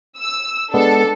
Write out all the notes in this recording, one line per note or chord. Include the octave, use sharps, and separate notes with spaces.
E6
G#3 B3 D4 A4